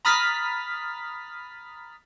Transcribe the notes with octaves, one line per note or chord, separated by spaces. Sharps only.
A#5 B5 D#6 F6 A6 B6